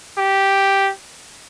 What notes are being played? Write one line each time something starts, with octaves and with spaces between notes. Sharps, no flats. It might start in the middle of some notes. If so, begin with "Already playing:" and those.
G4